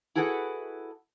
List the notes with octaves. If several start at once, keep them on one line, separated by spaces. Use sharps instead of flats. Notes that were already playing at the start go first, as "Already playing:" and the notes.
E4 F#4 G#4 A4 B4 F#5